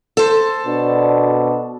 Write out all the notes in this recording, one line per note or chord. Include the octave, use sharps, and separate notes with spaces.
A4 C5
B2 D4